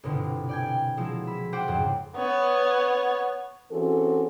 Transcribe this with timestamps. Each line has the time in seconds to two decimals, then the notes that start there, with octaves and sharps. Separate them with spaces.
0.03 G1 C2 B2 D3
0.49 D5 G5 G#5
0.97 F3 F#3 G#3 E4
1.27 B5 E6
1.53 F#4 C5 F#5 G5 D6
1.68 F2 G#2 C#3
2.16 B3 C#5
3.72 E3 C4 C#4 F#4 G#4 A4